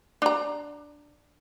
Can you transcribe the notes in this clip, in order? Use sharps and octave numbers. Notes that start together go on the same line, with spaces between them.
D4 A#5